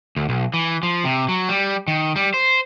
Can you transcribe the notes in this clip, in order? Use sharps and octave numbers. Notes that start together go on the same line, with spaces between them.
D2
B1
E3
F3
C3
F#3
G3
D#3
G3
C5